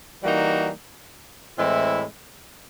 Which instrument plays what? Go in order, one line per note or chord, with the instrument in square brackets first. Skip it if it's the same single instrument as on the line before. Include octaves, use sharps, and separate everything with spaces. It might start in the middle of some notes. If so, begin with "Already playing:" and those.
[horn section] E3 G3 A#3 D#4 F#4
A2 E3 G#3 C4 E4